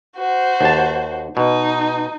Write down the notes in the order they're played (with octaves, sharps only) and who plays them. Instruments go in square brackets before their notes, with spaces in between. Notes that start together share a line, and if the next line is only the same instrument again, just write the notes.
[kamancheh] F#4 C5
[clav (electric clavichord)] D#2 A5
[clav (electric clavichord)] B2 [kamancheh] D#4